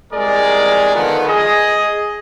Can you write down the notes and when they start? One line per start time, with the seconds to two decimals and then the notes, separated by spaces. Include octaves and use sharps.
0.13 C2 G#3 G#4 A#4 D5
0.95 D3 D#3 F3 B3
1.27 G#4 D#5